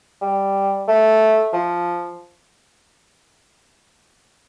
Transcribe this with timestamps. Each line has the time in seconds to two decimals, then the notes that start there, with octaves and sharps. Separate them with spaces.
0.21 G3
0.88 A3
1.53 F3